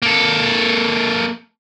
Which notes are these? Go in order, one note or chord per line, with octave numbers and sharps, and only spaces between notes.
A#3 A4